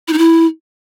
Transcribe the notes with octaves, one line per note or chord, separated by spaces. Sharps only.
E4
D#4
E4